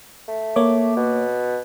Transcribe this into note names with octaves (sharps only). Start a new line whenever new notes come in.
A3
A#3 C#5 D6
B2